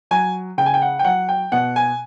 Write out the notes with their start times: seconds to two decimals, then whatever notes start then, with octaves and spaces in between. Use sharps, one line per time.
0.11 F#3 G#5
0.58 C#3 G5
0.66 G#5
0.74 G5
0.82 F#5
0.99 G5
1.04 F#3 F#5
1.29 G5
1.52 B2 F#5
1.76 G#5